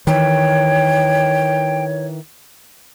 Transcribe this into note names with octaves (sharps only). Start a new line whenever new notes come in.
D#3 E3 C#5 G5